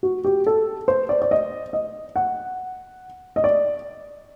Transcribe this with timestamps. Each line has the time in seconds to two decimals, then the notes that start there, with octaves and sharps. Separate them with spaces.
0.03 F#4
0.25 G4
0.47 A4
0.88 C5
1.09 D5
1.22 D5
1.31 D#5
1.73 D#5
2.16 F#5
3.36 D#5
3.44 D5